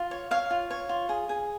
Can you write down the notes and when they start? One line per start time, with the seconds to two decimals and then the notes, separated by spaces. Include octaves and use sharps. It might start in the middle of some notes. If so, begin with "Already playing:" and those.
Already playing: F4
0.11 C#5
0.31 C#5 F5
0.51 F4
0.71 C#5
0.89 F4
1.09 G#4
1.29 G#4